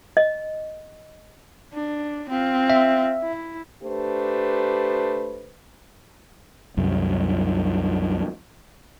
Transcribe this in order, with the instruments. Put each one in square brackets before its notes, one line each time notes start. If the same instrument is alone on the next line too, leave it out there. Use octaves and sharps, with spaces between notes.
[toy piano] D#5
[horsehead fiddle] D4
C4 F4
[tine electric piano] E5
[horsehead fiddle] E4
[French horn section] A3 D4 G4 B4 C5
[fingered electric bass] C2 F#2